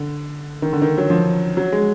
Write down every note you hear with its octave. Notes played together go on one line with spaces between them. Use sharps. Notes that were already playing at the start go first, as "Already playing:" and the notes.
Already playing: D3
D#3
D3
D#3
F#3
F3
F#3
G#3